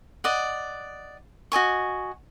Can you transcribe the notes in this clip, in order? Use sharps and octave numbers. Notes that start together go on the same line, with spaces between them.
D5 D#5 F#5
F#4 D#5 G#5 C#6